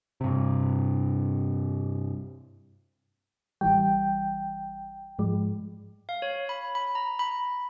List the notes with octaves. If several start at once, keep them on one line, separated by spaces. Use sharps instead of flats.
G2 C3
A1 E3 G3 G5
G#2 F3 G#3
F5
C#5
B5
B5
A#5
B5